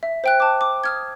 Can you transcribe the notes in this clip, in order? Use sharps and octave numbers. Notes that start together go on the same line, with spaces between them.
E5
C5 G5 F#6
A5 D6
D6
D#6 F6 G#6